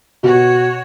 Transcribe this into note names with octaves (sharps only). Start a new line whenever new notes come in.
B2 F#4 C#5